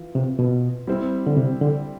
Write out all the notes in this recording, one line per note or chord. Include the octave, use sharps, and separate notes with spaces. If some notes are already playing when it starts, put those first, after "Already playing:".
Already playing: E3 F4
C3
B2
G3 C4 E4
D3
C3
D3